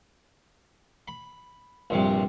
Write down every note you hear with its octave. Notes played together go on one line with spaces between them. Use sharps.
B5
A#1 G2 C3